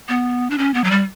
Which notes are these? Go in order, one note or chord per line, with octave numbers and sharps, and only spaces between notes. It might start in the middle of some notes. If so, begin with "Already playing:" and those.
B3
D4
C#4
B3
F#3
G3